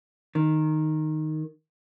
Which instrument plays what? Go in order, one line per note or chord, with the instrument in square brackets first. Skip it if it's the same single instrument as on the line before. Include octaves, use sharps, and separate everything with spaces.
[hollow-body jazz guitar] D#3